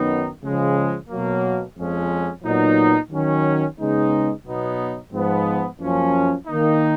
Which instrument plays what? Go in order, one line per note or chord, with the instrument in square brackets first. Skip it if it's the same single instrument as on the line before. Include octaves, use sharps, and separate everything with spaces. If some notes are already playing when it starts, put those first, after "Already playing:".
Already playing: [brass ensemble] F#2 D#3 F#3 B3 D#4
C#3 F3 G#3
B2 F#3 A#3
F2 F3 G#3 C#4
A#2 F#3 B3 D#4
D#3 F#3 C#4
C#3 G#3 B3 D#4
B2 F#3 B3 D#4
G#2 F3 B3
F#2 F3 A#3 C#4
D#3 A#3 D#4